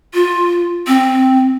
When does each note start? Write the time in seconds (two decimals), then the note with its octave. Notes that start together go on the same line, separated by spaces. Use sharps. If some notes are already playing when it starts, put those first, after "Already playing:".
0.14 F4
0.87 C4